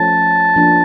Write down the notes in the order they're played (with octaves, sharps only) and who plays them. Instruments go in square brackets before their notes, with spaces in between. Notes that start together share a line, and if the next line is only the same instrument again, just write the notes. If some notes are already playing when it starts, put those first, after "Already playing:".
Already playing: [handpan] F3 A3 C#4 [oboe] A5
[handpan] F3 A#3 D4